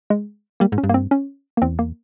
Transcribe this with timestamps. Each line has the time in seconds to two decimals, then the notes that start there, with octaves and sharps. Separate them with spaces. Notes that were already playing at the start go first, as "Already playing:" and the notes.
0.10 G#3
0.60 G3 A#3
0.72 G#2
0.78 C#4
0.84 G2
0.89 A#3
0.94 C4
1.11 C#4
1.57 A#3
1.62 E2 C4
1.79 A#3